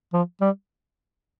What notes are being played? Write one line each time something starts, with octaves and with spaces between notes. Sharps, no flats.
F3
G3